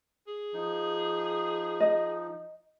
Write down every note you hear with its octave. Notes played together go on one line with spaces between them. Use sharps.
G#4
F3 D#4
D#5